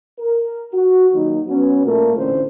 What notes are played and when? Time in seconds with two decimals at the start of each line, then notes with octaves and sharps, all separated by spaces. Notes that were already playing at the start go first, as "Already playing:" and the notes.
0.20 A#4
0.72 F#4
1.14 D#2 F#3 D#4
1.46 F#3 B3 C#4
1.84 A#2 A3 A#4
2.15 A1 A2 D3 C4 C#4 C5